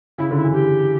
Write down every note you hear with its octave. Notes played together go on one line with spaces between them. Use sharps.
C#3 E4
D3 E4
E3
G4